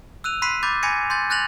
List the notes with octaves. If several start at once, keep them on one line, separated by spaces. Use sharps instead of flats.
E6 F#6 D#7 F7
B5 C6 F#6 B6 C7 D#7
B5 D6 G6 A6
G#5 B5 G#6 A#6 C#7 D#7
C6 G6 A6
F#6 G6 A6 A#6 F7 F#7